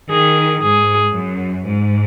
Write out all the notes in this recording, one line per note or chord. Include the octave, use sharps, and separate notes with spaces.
D#3 G#4
G#2 G#4
F#2
G#2